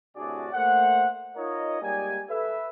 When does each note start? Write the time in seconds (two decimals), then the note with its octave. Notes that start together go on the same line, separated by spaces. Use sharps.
0.16 A2 C3 D4 F#4 G#4 D5
0.53 A3 A#3 C5 F#5
1.36 D#4 F4 A#4 C#5 D#5
1.82 G#2 G3 A#3 G4 D5 G#5
2.29 A4 B4 E5